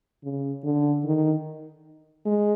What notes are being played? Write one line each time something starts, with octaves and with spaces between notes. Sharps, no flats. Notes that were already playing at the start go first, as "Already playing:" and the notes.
C#3
D3
D#3
G#3